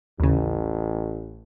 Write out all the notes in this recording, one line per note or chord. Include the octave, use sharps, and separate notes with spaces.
A1 D#2 C#3